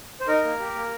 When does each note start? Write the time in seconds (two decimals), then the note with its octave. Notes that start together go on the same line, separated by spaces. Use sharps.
0.21 C5
0.28 D#4 A#4
0.44 A#3
0.60 G4
0.75 A#3